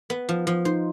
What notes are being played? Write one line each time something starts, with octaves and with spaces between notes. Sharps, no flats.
B3
F3
F3
D#4 C5